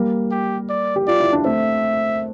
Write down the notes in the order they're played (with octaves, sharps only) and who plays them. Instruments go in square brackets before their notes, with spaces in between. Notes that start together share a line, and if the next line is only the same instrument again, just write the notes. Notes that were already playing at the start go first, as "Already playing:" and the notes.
Already playing: [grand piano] G3 A#3
[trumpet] G4
D5
[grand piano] G4
[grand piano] F4 [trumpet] D5
[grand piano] E4
D4
[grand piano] A3 C4 [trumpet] E5